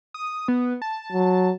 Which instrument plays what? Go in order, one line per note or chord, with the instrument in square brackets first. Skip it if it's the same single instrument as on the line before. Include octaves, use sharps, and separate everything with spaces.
[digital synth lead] D#6
B3
A5
[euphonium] F#3